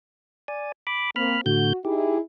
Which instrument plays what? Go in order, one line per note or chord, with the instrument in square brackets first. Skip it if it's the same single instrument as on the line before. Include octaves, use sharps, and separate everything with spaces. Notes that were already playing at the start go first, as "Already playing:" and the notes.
[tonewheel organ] D5 G#5
B5 D6
[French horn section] A#3 C4 [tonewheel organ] B5 F6
[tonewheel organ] A2 D3 G6 [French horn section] F#4
[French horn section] D#4 E4 G#4 [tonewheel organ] G4